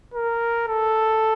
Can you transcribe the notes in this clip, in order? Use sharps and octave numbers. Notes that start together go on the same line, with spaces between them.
A#4
A4